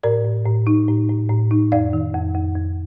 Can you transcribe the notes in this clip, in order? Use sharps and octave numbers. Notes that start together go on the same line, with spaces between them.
A2 A#4 D5
A2
A2
D#4
A2
A2
A2
D#4
F2 D5 F5
D#3
F2
F2
F2